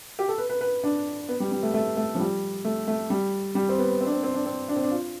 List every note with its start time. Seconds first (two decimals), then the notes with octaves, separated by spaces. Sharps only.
0.19 G4
0.28 A4
0.38 B4
0.50 B4
0.61 B4
0.84 D4
1.29 B3
1.40 G3
1.52 G3
1.63 A3
1.74 A3
1.97 A3
2.15 F3
2.19 G3
2.65 A3
2.88 A3
3.10 G3
3.55 G3
3.69 C4
3.78 B3
4.01 C4
4.06 D4
4.12 C4
4.23 C4
4.34 D4
4.46 C4
4.69 D4
4.76 C4
4.83 D4
4.91 F4